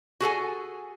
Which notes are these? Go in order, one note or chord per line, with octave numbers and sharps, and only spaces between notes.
F#4 G#4 A4 G#5